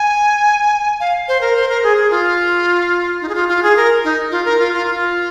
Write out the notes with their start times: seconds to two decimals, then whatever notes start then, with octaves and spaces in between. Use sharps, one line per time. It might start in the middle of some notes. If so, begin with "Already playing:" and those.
Already playing: G#5
1.00 F5
1.28 C5
1.41 A#4
1.56 C5
1.69 A#4
1.83 G#4
1.97 G#4
2.11 F4
3.21 D#4
3.29 G#4
3.35 F4
3.48 F4
3.63 G#4
3.77 A#4
4.04 D#4
4.31 F4
4.45 A#4
4.59 F4
4.73 F4
4.87 F4